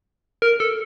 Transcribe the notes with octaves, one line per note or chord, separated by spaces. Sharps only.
A#4
A4